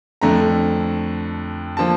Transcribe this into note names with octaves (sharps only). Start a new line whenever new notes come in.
F2 D3 A3 A#5
D3 F3 A#3 A5